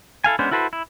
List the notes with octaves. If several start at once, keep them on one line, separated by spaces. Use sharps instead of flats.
E4 A4 F5 G#5
G#3 B3 C#4 D4 C5
E4 F#4 A4 B4 C5
E4